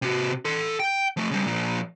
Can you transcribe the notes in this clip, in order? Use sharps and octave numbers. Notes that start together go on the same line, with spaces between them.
C3 F#4
A4 C6
G5
F3 A3
C#3 G3
A#2 F3